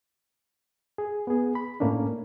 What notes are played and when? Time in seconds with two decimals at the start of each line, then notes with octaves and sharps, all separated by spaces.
0.98 G#4
1.27 B3 G#4
1.55 B5
1.80 A2 A3 A#3 C#4 D4